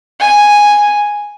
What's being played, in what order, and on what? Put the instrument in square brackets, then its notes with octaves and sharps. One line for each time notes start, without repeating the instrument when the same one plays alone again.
[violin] G#5